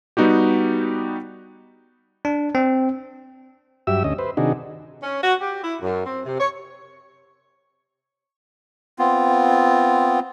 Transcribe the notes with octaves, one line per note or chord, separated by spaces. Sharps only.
G3 B3 D#4 F#4 G4
D4
C4
G2 F#3 G4 E5 E6
D2 C#4 D#5
B4 C5
C3 D#3 D4 D#4 F#4 G#4
C#4
F#4
G4
E4
F#2
C4
C3
C#5
B3 C4 F4